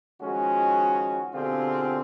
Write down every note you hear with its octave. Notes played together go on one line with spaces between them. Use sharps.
D#3 F3 G#3 C#4 F#4
B2 D3 C4 F4 G4 G#4